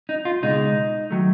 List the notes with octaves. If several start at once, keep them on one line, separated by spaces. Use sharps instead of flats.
D#4
F4
C#2 B2 G#3 D#4
D#3 F#3 A3